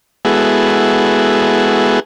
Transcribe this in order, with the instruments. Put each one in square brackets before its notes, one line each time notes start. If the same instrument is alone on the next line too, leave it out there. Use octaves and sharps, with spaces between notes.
[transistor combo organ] G#3 B3 E4 F#4 G#4 A4